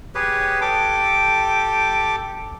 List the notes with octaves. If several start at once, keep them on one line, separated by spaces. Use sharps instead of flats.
G4 G#4 B4 C#5
G4 A4 G5 D6